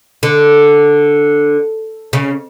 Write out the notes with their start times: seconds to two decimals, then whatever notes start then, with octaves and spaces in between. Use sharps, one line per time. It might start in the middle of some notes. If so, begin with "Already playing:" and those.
0.23 D3
2.13 C#3